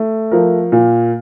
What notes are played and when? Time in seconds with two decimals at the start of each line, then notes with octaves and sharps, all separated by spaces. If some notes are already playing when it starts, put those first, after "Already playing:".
Already playing: A3
0.31 F3 A#4
0.72 A#2